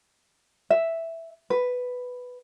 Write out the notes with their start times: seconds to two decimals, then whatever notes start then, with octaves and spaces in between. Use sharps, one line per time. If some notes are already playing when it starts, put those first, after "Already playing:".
0.70 E5
1.50 B4